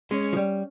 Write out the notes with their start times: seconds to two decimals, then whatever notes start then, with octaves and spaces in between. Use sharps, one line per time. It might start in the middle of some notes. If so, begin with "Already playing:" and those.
0.11 G#3 C#4
0.33 F3
0.37 G3